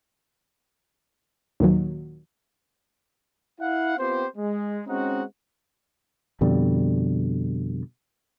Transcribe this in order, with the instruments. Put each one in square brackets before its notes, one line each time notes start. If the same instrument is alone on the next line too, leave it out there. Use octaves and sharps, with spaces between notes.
[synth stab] D#2 A#2 D#3 F#3
[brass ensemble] E4 F5 F#5
B3 C4 F4 G4 C5
G#3
G#3 C4 C#4 D#4 F#4 F#5
[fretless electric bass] F2 B2 D3 G3